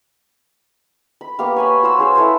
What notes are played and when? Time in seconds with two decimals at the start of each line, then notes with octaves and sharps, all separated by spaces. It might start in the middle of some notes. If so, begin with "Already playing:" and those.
1.21 B5
1.39 A#3 B3 G4 F5
1.56 C#5 G#5 B5
1.83 F#4 C5 F5 E6
1.98 C#4 G#4 C5 C#5
2.15 E4 A4 B4 C5